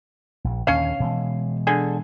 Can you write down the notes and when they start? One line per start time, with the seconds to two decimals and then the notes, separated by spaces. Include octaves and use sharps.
0.44 A#1
0.67 D#2 A#2 D3 C#4 F5
1.00 B2 E3 G#3
1.67 D3 G#4